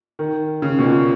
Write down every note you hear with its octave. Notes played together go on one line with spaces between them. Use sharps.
D#3
C#3
B2
A#2